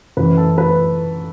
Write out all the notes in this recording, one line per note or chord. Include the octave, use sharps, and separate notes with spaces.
F#2 E3 B4
A4
B4